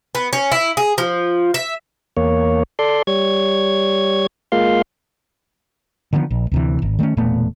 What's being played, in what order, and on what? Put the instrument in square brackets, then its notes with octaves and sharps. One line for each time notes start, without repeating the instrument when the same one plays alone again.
[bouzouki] B3
C#4
E4
G#4
F3
E5
[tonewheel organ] E2 A#3 C#5
A4 D5 C6
G3 C#5 G#6
G#3 A#3 F4 F5 C6
[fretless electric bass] D3 D#3 F3 B3
A#1
D2 C3 E3
G#1
D#3 A3 A#3 C#4
E1 A#2 A3 B3